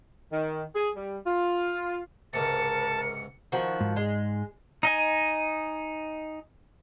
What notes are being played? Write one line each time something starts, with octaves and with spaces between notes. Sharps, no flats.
D#3
G#4
G3
F4
C#2 G#2 C3 A#4 A5 C#7
D#3 F3 F#4
G#2
G#3
D#4 D#5 G#5